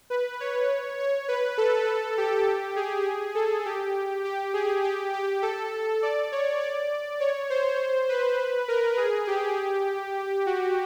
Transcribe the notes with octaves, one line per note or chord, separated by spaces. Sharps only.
B4
C#5
C#5
B4
A4
G4
G#4
A4
G4
G4
G#4
G4
G4
A4
D5
C#5
D5
C#5
C5
B4
A#4
G#4
G4
F#4